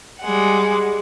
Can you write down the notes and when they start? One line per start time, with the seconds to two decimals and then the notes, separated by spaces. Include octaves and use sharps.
0.21 G3 G#3 F#5